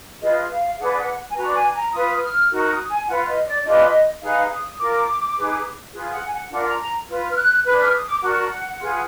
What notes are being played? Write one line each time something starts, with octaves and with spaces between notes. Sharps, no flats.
F4 G#4 B4 D#5
F5
D4 G#4 B4 F#5
F#5
G#5
D4 F#4 B4 A#5
G#5
A#5
F4 B4 D#6
D#6
F6
D#4 F#4 A#4
D#6
G#5
F4 B4 F#5
D#5
D5
D4 F4 G#4 B4 D#5
D#4 G#4 B4 F5
D#6
F4 A#4 D6
D#4 G#4 B4
F4 G#4 B4
F#5
G#5
F#5
D4 F4 A#4 F#5
A#5
A#5
F4 B4
F6
F#6
D4 G#4 B4 F#6
F6
D#6
D6
D4 F#4 A#4 F#5
F4 G#4 B4